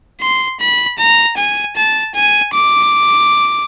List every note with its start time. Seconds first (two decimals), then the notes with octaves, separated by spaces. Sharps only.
0.21 C6
0.60 B5
0.99 A#5
1.38 G#5
1.77 A5
2.15 G#5
2.54 D6